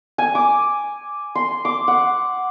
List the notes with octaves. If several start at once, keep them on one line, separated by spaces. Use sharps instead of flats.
G#5
D6
C6
D6
F#5